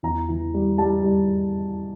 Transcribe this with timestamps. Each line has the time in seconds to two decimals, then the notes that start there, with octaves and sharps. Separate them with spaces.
0.03 E2 A#5
0.28 E3
0.54 G3
0.78 G3 A5
1.03 G3